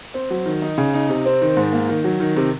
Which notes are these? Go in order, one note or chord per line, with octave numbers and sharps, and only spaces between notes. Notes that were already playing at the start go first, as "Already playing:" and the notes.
C4
F#3
D#3
D#4
C#3
D#4
C3
C4
D#3
G#2
A#3
D#3
F#3
D#3
C3